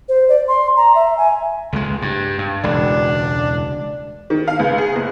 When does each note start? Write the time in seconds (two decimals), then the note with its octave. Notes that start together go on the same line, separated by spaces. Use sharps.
0.09 C5
0.29 D5
0.48 C6
0.77 A#5
0.95 E5
1.17 G#5
1.73 C#2 G3 G#3
2.02 G2
2.38 G2
2.63 E1 C#2 D4
4.30 D#3
4.48 F5
4.59 C#2
4.78 G#4
4.96 F#1